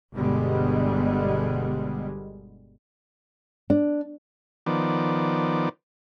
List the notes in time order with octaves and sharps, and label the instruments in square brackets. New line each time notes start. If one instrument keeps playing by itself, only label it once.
[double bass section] G1 B2 D3 G3 G#3 B3
[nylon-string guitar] D4
[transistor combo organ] D#3 F3 B3 D5